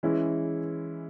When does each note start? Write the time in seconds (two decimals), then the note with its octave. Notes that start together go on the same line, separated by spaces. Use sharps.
0.03 E3 G#3 C#4 E4